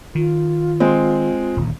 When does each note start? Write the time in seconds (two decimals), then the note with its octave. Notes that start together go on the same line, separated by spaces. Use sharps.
0.15 D#3 F4
0.80 G#3 C4
1.57 D#1 D2